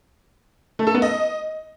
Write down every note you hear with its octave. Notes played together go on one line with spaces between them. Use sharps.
A3
A4
B3
D#5